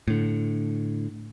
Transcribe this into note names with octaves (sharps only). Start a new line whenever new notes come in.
A2 D3